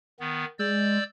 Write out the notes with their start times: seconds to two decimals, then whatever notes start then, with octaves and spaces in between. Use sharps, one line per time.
0.20 D#3 B3
0.59 G#3 D5 E6 G6